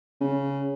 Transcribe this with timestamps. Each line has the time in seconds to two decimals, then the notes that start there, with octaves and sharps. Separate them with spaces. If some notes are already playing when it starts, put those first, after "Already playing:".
0.21 C#3